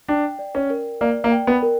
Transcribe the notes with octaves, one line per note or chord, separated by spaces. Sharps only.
D4 G5
D5
C#4
A#4
A#3 D5
A#3
G5
B3
A#4